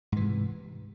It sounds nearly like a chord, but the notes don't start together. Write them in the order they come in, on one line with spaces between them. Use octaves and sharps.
G#2 E3 C3